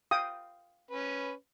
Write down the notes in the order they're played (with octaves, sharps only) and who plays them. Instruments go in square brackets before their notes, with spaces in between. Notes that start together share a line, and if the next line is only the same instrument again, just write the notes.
[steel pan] F5 G5 D#6
[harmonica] C#4 B4